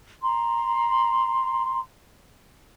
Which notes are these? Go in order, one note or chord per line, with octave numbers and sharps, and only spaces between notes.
A#5 C6